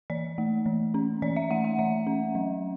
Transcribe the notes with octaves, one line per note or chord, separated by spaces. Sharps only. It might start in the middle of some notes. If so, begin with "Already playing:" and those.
E3 D5
A3
E3
C#4
E3 D5
E5
A3 F#5
F#5
E3 E5
C#4
F#3